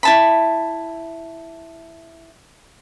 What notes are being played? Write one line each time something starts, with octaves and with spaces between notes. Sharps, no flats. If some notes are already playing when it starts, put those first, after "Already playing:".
E4 A5 B5